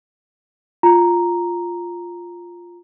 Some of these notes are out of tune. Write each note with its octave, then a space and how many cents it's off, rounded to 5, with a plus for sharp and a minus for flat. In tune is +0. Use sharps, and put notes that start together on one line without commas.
F4 +0 A#5 +0